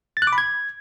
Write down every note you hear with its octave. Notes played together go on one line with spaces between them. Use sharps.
A6
F#6
D6
B5
G#6